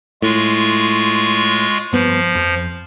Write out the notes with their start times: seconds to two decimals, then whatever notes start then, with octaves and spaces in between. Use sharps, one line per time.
0.22 A2 G#3 F4 C#6
1.93 G2 F3 B3
2.35 F2